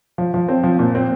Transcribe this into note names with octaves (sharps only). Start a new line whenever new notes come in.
F3
F3
C4
F3
A#2
C4